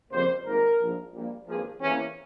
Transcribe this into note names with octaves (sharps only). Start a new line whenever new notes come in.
F2 C#3 G3 A#3 C5
G#1 G#2 G3 A#3 A#4
A#1 G#2 F3
A#1 A#2 G3 A#3
G#1 G2 F3 A#3 G#4
E2 C3 E3 A#3 C#4